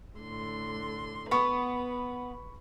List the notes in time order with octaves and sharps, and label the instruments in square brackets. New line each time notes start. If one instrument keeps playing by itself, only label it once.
[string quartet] A2 D3 C6
[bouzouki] B3 [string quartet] B4 [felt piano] B5 C#6